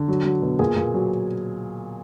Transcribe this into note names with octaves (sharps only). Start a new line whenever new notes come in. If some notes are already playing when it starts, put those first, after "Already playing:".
Already playing: D3
F#3
F#3
B2
A#2 G#4
A#2
F#3